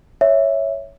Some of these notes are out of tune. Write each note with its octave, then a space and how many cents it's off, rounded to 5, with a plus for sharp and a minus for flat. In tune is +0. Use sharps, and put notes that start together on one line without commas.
C#5 +0 E5 +0